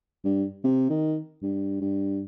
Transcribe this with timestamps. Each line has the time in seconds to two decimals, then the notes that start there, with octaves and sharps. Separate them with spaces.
0.25 G2
0.64 C3
0.90 D#3
1.42 G2
1.81 G2